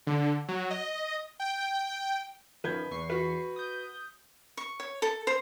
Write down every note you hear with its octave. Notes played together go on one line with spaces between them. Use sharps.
D3
F#3
D#5
G5
F#2 D#3 F3 B4 G6 G#6
E2 C#6 C7
F#4 B4
D#6 G6
C#6
C#5
A4
C5